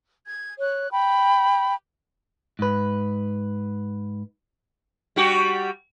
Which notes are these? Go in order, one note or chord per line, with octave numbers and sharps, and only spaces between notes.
G#6
C#5 F#6
G5 B5
G#2 B4
G3 F#4 G4